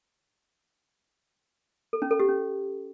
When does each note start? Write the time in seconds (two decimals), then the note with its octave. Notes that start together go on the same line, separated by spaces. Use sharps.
1.93 A4
2.02 C#4
2.11 A4
2.20 G4
2.28 C#4